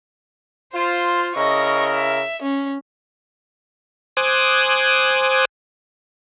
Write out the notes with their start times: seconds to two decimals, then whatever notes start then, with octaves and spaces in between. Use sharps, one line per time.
0.74 F4 C5
1.35 C#3 E4 A#4 D#5 C#6
1.94 E5
2.42 C#4
4.17 C5 G#5 D6 D#6 F#6